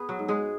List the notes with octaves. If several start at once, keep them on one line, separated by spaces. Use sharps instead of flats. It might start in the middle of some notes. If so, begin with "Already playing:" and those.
Already playing: B3 G#4 B4
F#3 F#4
G#2
G#3 G#4